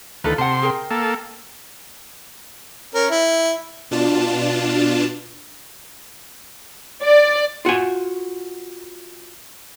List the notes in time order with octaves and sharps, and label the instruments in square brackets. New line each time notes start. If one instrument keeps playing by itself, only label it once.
[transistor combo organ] D2 D#3 B4 [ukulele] F4 A4
[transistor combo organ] C3 C6 [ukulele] F#5 A5
[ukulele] G#4 A#4 G5
[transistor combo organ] A#3 A4
[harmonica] C#4 A#4
E4
[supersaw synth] B2 D4 F4 A5
[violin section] D5
[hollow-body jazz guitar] F4 F#4 F#5 G#5